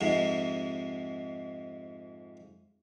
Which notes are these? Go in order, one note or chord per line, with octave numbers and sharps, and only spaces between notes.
F2 G#2 C3